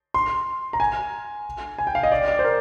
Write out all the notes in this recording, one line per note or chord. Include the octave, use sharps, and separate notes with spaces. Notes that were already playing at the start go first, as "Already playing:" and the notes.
C6
A#5
G#5
G#5
G5
F5
D#5
D5
D5
C5
A#4